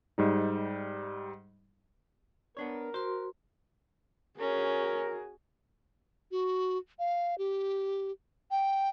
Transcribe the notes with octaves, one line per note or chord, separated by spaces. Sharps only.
G#2 G3 D#4
B3 D4 A#4 C#5
F#4 C5 C6
C#4 F#4 G#4 A#4
F#4
F5
G4
G5